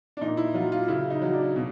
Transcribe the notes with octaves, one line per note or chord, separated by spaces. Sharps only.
D4
A#2 D#4
E4
F#3 F4
F4
C#3 E4
D#4
F#3
D4
B2